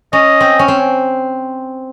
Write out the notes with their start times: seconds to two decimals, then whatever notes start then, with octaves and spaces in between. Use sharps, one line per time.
0.13 C#4 D#5
0.41 C4
0.59 C#4
0.68 C4